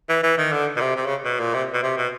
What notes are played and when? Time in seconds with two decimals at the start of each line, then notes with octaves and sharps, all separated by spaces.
0.09 E3
0.23 E3
0.38 D#3
0.52 D3
0.76 B2
0.81 C3
0.96 C3
1.06 C#3
1.24 B2
1.39 A#2
1.54 C3
1.73 B2
1.83 C3
1.97 B2